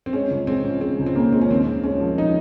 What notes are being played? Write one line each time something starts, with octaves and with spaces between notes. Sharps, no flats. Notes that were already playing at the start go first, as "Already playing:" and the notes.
C4
G#3 C#4
C#2
G#3 C4
C#3
G#3 C4
C#2
C4
C#3 A#3
G#3 C4
C#4
D#2 C4
C#3
G#3 C#4
F3
F3 D#4